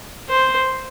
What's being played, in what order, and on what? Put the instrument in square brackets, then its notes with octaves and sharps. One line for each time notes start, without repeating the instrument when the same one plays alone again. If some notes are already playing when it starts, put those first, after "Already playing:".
[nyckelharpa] C5